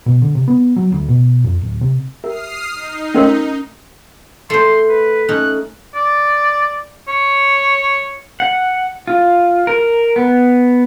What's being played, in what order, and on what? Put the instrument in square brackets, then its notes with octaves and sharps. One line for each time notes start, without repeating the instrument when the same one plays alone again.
[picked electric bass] B2
D3
C3
B3
F#3
D2
B2
F2
D1
C3
[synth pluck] G4 A#4 E5 [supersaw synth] D#6 F6 C7
[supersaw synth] D#4
[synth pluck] A3 C6 B6 [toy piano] C#4 A#4 C5
[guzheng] A3 C5 [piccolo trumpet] C6
[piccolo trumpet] B4
[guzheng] A3 C#4 D#4 [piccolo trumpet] F#6
[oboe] D5
C#5
[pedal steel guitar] F#5
F4
A#4
B3